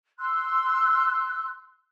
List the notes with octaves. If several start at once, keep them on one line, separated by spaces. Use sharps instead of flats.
C6 E6 F#6